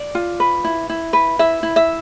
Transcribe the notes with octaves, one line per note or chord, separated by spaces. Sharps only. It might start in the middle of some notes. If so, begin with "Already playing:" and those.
Already playing: D5
F4
B4
E4
E4
B4
E4 E5
E4
E5